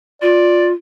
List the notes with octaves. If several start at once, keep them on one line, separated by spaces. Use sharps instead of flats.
F4 D5